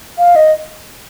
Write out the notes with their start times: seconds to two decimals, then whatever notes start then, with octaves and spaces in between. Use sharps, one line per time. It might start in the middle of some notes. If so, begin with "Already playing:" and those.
0.18 F5
0.36 D#5